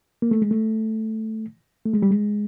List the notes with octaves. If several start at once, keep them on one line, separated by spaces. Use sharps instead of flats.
A#3
A3
G#3
A3
A3
G#3
G3
G#3